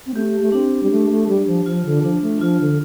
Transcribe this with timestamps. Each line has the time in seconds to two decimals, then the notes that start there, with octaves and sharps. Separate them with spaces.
0.07 C4
0.14 A3 G4
0.41 A3
0.52 C4 D4
0.83 G3
0.91 A3
1.10 A3
1.29 G3
1.47 F3
1.65 F3 F4
1.85 D3
2.03 F3 D4
2.22 A3
2.41 F3 F4
2.61 D3